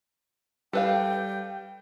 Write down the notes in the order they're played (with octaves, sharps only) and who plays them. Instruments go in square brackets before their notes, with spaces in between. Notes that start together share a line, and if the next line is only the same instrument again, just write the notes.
[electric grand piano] G3 [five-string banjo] A4 B4 F5 [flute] G5